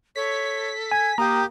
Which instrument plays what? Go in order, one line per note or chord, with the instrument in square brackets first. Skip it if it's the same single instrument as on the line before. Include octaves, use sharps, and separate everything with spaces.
[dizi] A4 [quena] C#5 [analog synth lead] B6
[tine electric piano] G#5 [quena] G#6
[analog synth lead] A#3 [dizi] G4 [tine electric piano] G5 A#5 [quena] D#6